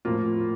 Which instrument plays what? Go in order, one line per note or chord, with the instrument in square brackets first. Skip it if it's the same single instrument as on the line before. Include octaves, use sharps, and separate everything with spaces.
[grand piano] A2 F3 A#3 F4